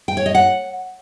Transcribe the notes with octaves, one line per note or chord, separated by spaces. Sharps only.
G5
C#5
D#5
F#5